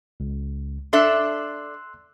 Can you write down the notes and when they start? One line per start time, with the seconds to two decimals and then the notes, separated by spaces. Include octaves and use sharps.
0.20 C#2
0.93 D4 A4 E5 C6 E6 F#6